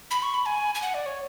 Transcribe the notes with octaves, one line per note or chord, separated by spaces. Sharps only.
B5
C#6
B5
G#5
G#5
F#5
D5
C#5